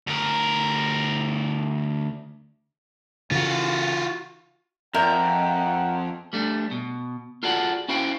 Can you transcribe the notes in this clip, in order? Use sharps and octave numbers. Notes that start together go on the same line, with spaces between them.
D2 A#4
C#3 E3 F4 F#4
F2 A#4 E5 F#5 G5 G6
G3 A3 D4
B2
F4 F#4 G#4 A4 D5 F#5
C#4 E4 F#4 C5 F5 G5